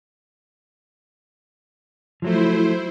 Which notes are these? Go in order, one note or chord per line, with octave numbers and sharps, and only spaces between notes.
F3 F#3 A3 E4 C5